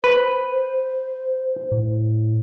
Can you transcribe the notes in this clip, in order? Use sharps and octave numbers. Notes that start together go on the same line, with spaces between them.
B4 C5
A2